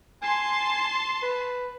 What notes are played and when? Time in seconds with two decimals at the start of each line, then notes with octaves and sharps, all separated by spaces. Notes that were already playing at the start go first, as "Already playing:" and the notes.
0.22 G#5 A5 C6 C7
1.22 B4